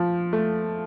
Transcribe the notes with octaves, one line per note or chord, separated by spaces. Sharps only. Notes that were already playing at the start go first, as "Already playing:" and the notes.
Already playing: F3
A3